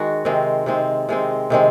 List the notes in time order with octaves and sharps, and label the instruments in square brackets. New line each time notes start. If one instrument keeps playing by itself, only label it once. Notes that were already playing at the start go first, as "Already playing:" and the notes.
Already playing: [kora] D#3 G#3 F#4
C3 D#3 G#3 C4
C3 D#3 G#3 C4
C3 D#3 G#3 C4
C3 D#3 G#3 C4